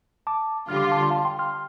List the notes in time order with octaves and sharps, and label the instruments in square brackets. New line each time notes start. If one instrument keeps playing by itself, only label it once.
[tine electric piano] A5 D6
[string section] D3 G3 F4 [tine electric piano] F6
[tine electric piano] D6
C6
A5 D6
C6
F5 A5
G5 C6
C6 F6